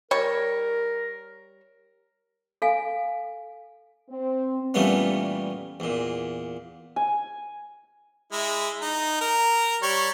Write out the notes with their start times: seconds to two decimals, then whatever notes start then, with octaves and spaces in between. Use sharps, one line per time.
0.11 G3 A#4 C#5
2.62 A4 F5 G#5
4.10 C4
4.74 A#2 E3 G3 A3 B3 C#4
5.80 E2 A#2
6.96 G#5
8.32 G#3 E4
8.82 D#4
9.21 A#4
9.82 G3 C#5